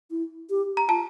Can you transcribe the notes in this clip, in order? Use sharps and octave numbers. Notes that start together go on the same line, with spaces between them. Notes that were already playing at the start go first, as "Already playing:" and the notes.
E4
G4
A#5
F4 A5